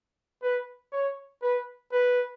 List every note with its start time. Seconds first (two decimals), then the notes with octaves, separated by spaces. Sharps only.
0.43 B4
0.92 C#5
1.42 B4
1.92 B4